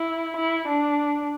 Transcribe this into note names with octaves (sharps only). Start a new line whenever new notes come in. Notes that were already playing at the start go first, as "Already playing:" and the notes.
Already playing: E4
E4
D4